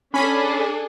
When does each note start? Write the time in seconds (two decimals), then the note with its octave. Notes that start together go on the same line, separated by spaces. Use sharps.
0.14 C#4 D4 G#4 A4 B5